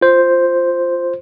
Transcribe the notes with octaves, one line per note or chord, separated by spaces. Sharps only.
F4 C5